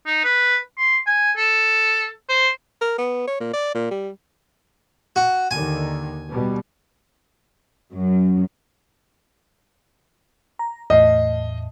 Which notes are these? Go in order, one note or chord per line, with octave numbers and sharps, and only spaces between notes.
D#4
B4
C6
G#5
A4
C5
A#4
B3
C#5
A#2
D5
A#2
G3
F#4
D#2 D3 D#3 G#5
B2 G3
F#2
A#5
E2 A2 D#5